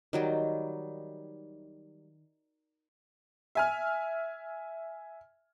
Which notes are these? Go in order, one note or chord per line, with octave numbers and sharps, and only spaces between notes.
D#3 F#3 G3
E5 G#5 F6